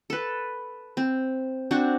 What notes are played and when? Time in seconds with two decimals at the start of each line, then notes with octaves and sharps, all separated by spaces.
0.10 A4 B4
0.97 C4
1.71 C4 D4 F#4